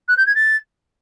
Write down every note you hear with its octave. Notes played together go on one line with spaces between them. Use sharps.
F#6
G6
G#6
A6